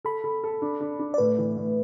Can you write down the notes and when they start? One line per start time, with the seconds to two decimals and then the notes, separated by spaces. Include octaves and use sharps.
0.05 A4 B5
0.24 A4
0.44 A4
0.62 D4
0.81 D4
0.99 D4
1.14 D5
1.18 A2 B4
1.38 E3
1.57 A2